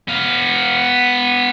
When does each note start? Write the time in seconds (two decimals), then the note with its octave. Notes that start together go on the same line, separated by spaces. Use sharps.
0.08 B3 F5